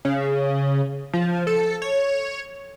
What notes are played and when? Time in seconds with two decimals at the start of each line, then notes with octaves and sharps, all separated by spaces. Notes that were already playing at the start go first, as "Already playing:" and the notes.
0.05 C#3
1.13 F3
1.47 A4
1.82 C#5